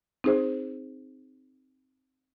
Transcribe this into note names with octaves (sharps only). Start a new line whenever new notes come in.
C4 D#4 G#4 C5